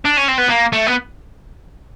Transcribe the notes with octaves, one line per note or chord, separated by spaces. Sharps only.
D4
C#4
C4
B3
A#3
A3
B3